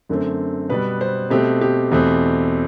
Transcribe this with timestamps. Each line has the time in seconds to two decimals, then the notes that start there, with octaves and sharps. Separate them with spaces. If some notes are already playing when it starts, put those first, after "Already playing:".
0.09 F#2 D3 A3 C4
0.69 B2 G3 B3 B4
1.01 C5
1.30 B2 A3 C4 G4
1.61 G4
1.91 E2 B2 A3 C4